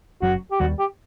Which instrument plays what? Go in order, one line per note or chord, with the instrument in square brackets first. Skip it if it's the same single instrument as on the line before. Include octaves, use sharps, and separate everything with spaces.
[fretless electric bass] F#1 F#2 F#3 [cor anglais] F#4
[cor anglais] G4
[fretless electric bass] D#2 D#3 G3 [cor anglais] F#4
[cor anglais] G4